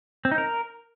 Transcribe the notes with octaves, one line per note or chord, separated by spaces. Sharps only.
C4
D#4
A#4